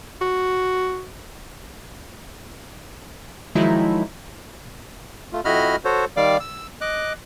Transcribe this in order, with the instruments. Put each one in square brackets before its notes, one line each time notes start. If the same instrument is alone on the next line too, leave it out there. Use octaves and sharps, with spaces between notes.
[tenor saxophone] F#4
[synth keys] D#3 F3 F#3 G#3 D#4 E4
[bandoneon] A3 F4
F2 E4 F#4 D#5 B5 F6
F#4 A4 C5 C#5
D#3 G3 D5 F5 D6
E6
D#5 D6 F#6